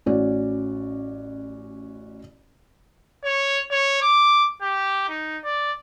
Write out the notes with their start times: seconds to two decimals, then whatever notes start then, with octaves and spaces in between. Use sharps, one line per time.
0.06 A1 C#4 F#4 D5
3.24 C#5
3.71 C#5
4.02 D6
4.62 G4
5.09 D#4
5.44 D5